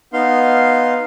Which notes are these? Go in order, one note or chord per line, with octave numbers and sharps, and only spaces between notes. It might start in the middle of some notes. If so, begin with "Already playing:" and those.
B3 D#4 F5 C6